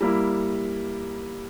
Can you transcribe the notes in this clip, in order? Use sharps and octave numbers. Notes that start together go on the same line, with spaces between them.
G3 A#3 E4